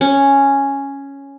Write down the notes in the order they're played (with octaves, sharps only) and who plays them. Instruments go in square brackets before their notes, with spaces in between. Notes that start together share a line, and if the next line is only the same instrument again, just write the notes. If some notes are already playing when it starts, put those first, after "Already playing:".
[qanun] C#4